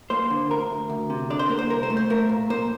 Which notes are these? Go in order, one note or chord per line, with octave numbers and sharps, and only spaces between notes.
A#3 C5
D3
D2 A#4
D2
D2
C3
D3 D5
C5
A#3 A#4
C5
C2 A#4
C5
A3
C5
A3 A#4
A#2
A#3 C5